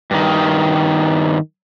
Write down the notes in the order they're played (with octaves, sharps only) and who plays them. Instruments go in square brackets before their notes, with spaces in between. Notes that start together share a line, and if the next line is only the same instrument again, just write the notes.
[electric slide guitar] G2 D#3